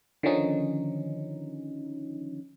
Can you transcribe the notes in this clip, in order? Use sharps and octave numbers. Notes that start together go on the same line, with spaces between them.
D3 D#3 F3 C#4 D#4